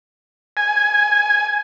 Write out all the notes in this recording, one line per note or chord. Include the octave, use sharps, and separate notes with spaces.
G#5